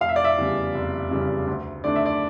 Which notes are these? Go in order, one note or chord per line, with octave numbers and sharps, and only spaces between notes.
F1 F5
E5
D5
E5
E2 C#3 G3
F1
E2 C#3 G3
D2
D3 A3 D4 D5
E5
D5